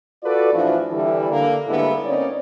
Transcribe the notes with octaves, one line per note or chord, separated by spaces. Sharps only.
F4 F#4 A4 B4 D5
A2 E3 F3 D4 E4 F#4
D3 E3 G3 E4
D3 A#3
G#2 D3 G3 A#3 B3 E4
A#3 C4 C#4 D#4 C#5 D5